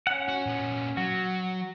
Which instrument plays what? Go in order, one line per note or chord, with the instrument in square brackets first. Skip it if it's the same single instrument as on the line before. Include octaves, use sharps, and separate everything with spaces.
[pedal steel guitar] C#4 F#5
[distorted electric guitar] F#4
A#2 B3
[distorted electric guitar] F#3 [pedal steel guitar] F#4